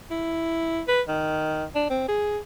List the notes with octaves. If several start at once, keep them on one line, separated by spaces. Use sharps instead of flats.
E4
B4
D#3
D4
C4
G#4